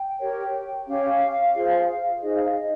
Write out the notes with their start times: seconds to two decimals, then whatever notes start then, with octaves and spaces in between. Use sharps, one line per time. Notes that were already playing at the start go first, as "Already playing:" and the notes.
Already playing: G5
0.19 G4 A#4 C#5
0.87 C#4 G4 C#5 F5
1.54 F4 G#4 C5
2.21 D#4 G#4 C5 D#5
2.35 F5
2.49 D#5